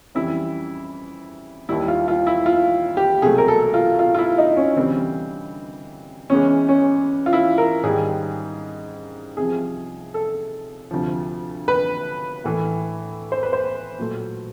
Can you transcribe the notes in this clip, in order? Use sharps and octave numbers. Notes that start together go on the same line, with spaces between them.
F2 C#3 E3 G3 E4
D#2 D#3 G3 E4
F4
F4
E4
F4
G4
C2 B2 F#3 A3 G#4
A#4
A4
F4
F4
F4
E4
D#4
C#4
D2 C3 E3 G3 C4
E2 C#3 E3 G#3 C#4
C#4
F4
E4
A#4
G#2 D#3 G3 G#4
C2 C3 F3 G#4
A4
D2 C3 F3
B4
A2 E3 A3
C5
B4
C5
A#2 F#3 A3